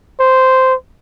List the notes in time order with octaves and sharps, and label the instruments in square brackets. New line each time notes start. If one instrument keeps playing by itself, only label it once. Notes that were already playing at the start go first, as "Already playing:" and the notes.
[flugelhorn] C5